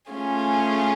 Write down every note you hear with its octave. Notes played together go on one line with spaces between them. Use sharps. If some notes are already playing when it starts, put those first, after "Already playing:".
A3 C#4 F4 G#4